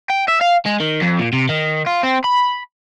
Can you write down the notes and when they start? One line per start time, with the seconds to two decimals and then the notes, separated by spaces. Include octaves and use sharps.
0.10 G5
0.28 E5
0.41 F5
0.66 G#3
0.80 D#3
1.01 F2
1.19 A#2
1.33 C3
1.49 D#3
1.86 F4
2.03 C4
2.24 B5